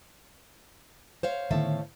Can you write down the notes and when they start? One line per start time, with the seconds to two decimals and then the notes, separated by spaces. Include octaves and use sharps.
1.23 C5 C#5 F5
1.51 A2 D3 D#3 B3 E5 A5